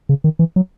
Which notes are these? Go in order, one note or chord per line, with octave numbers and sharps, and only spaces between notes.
C#3
D#3
E3
F#3